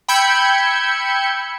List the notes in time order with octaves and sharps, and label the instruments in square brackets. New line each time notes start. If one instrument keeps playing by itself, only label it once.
[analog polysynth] G5 B5 E6 G6 G#6 C#7